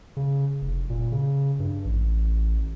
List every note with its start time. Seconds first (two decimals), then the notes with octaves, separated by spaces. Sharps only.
0.17 C#3
0.62 F1
0.90 A#2
1.12 C#3
1.60 G2
1.85 A1